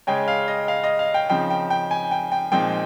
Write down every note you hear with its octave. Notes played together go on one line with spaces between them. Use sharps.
C#3 G#3 C#4 G5
F5
D#5
F5
D#5
F5
G5
C#3 F3 C4 D#4 G5
G5
G5
G#5
G5
G5
A#2 F3 G#3 C4 D#4 G5